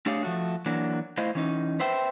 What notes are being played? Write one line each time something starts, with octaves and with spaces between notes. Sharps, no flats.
A3 D4 G4 G#4 C#5 F5
F3 A3 F#4
E3 F#3 A#3 D4
A3 E4 C5 D#5 F5
E3 C#4 D#4
B4 C5 E5 G5